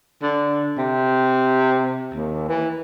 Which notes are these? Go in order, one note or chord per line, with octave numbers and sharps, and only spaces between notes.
D3
C3
D#2
E3